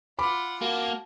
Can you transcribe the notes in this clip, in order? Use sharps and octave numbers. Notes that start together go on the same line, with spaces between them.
F4 F#5 B5 D6
A#3 F#4 A5